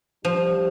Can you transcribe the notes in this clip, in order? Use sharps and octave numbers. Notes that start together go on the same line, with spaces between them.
F3 G3 D4 G4